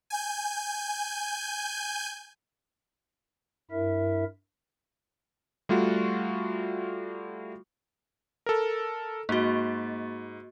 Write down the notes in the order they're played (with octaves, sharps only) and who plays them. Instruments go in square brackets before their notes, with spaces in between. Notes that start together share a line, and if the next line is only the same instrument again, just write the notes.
[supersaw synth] G#5 G6
[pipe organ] G2 E4 A#4 E5
[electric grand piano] G3 A3 F4 F#4
A4 A#4
[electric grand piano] G#2 [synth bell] A#3 F#4